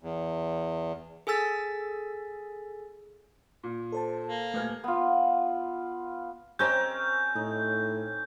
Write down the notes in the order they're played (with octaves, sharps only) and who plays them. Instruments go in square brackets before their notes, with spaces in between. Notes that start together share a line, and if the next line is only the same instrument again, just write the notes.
[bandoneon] E2
[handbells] G#4 A4 G#5 E6 A6 B6
[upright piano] A#2
[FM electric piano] A4 C5 A5
[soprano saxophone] A#3
[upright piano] D#1 F6 G#6 [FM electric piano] A3 B4
[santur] B3 F4
[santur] C4 C#4 A#4 [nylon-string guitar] G4 C5 D#5 [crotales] G6
[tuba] A2 [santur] D#4